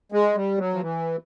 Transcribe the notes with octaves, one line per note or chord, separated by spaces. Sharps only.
G#3
G3
F#3
F3
E3